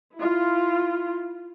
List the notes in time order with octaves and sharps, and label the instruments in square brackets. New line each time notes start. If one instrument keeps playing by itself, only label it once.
[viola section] E4 F4